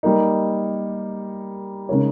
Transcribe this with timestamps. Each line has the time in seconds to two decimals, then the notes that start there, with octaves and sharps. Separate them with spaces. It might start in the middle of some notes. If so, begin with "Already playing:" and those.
0.03 G3 A#3 D#4
1.89 C#3 G#3 D#4 A#4 C#5